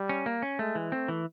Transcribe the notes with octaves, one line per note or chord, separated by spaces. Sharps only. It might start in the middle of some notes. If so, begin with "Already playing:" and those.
Already playing: G3
C#4
A#3
C#4
G#3 A3
E3
A3 C4
E3